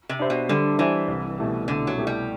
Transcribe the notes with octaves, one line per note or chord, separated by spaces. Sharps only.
C3
D4 G4 C5 E5
B2
D3 G3
E3 D4 G4 C5 E5
C2
B2 A3 E4 G4
C2 D3
F#3
B2 A3 E4 G4
G3